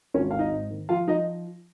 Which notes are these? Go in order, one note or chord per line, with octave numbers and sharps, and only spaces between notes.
G#1 C#4 C#5
G#1 F5
D#4 D#5
G#2
D#3
F3 F4 F5
F3 D#4 D#5